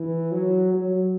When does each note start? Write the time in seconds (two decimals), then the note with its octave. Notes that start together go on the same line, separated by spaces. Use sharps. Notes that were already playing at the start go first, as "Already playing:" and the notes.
Already playing: E3
0.32 F#3
0.74 F#3